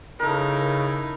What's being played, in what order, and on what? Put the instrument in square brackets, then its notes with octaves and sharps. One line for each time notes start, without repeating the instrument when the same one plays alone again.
[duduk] C#3 [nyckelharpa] D#4 E4 [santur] A4 A#4